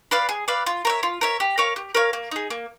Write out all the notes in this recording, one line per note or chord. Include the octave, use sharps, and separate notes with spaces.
B4 D5 F5
G#4
B4 D5 F5
F4
A#4 C#5 E5
F4
A#4 C#5 E5
G4
A#4 C#5 F5
G4
A#4 C#5 F5
A#3
D#4 G#4
A#3